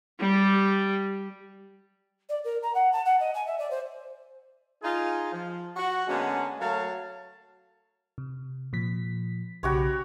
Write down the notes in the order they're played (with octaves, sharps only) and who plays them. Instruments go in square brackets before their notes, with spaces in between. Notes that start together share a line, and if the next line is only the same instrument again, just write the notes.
[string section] G3
[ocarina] D5
A#4
A#5
F#5
A5
F#5
D#5
G#5
E5
D5
C5
[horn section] D#4 F4 G#4
F3
F#4
D3 G#3 A#3 B3 C#4
F#3 A3 A#4 C#5 F5 A5
[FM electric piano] C3
A#2 F3 B6
[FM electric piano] B1 C#3 B5 [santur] F#4 G4 C#5